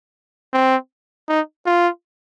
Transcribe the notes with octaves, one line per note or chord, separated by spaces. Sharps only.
C4
D#4
F4